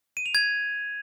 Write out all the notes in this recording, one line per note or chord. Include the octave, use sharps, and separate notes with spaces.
D#7
F7
G#6